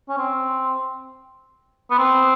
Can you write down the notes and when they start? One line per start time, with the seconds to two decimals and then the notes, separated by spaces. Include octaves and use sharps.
0.09 C#4
0.18 C4
1.91 B3
1.98 C4